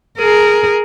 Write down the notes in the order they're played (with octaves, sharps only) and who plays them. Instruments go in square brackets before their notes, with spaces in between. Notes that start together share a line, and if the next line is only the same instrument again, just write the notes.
[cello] G#4 A#4